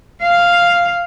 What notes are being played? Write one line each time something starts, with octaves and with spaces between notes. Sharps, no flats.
F5